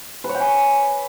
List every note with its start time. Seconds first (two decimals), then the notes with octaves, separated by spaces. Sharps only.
0.24 B4
0.29 C#5
0.35 G5
0.40 G#5